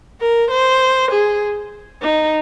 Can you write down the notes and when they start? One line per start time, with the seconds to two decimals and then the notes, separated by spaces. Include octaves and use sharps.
0.21 A#4
0.51 C5
1.11 G#4
2.02 D#4